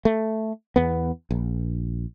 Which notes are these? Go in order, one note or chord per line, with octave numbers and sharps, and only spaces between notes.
A3
E2 B3
A#1